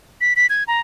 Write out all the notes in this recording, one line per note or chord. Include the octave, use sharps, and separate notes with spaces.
B6
B6
G#6
A#5